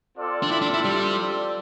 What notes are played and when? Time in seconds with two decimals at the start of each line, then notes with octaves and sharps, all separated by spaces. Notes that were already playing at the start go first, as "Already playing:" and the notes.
0.17 C4 F4 A4 D5
0.43 D4
0.51 E4
0.62 D4
0.74 E4
0.85 G3